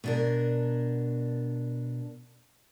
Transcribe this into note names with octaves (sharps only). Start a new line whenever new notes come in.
B2 D4 A#4